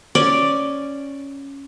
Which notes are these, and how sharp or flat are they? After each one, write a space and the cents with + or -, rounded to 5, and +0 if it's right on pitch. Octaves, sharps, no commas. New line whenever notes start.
C#4 +0 D5 +0